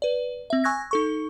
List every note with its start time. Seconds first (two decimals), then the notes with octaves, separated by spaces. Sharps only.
0.02 B4 D5
0.50 C4 E5
0.64 G#5 C#6 E6 F#6 G#6 A#6
0.91 D#4 A4 C#6